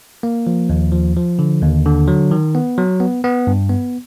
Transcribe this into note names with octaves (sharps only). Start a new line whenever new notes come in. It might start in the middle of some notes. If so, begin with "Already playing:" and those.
A#3
F3
D#2
F3
F3
D3
D#2
D3
F#3
D#3
B3
F#3
B3
B3
G2
B3